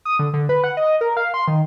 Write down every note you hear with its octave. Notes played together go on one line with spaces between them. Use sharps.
D#6
D3
D3
B4
F#5
D#5
A#4
F5
C6
D#3